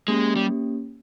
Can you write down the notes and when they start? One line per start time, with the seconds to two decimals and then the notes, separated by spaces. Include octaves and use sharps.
0.08 G#3 A#3 C#4 G4
0.36 G3